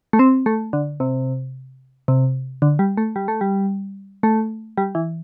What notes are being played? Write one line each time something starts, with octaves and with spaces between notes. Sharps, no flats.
A3
C4
A3
D3
C3
C3
D3
G3
A3
G3
A3
G3
A3
G3
E3